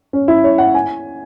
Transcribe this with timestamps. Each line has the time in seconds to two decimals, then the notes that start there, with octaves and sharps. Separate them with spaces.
0.13 C#4
0.28 E4
0.44 C#5
0.58 F#5
0.74 G#5